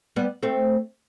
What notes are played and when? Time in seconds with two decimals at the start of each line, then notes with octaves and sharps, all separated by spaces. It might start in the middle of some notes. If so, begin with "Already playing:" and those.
0.16 G3 B3
0.43 A3 C4